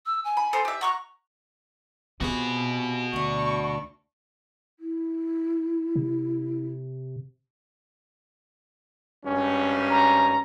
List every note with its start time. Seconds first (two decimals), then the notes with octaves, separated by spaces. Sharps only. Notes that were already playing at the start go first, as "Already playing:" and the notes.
0.06 E6
0.24 G#5
0.37 B5
0.53 A4 C5 A#5
0.65 G4 E5
0.81 F#4 A#5 C#6 F#6
2.21 C3 B3 F4 F#4 G#4 B4
3.14 D2 D4 C#6
4.80 E4
5.96 C3
9.25 G#1 G2 C#4
9.90 A#5